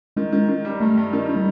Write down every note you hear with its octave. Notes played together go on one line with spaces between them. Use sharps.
D#3 G#3
D#3
D#3
G3
G2 A3
G2
D#3
D#3
G3